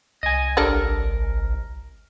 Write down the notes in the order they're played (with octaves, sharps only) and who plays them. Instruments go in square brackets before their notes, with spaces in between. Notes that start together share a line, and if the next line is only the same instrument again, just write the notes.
[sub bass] C2 [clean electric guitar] D#5 G#5
[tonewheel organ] G#1 [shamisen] G3 D4 A4 [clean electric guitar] A#4